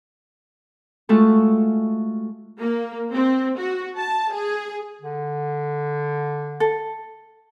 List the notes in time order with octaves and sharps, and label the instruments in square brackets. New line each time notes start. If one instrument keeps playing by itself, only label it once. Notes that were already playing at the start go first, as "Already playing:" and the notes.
[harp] G#3 A3 F4 F#4 A4
[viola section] A#3
C4
F#4
A5
G#4
[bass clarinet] D3
[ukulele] A4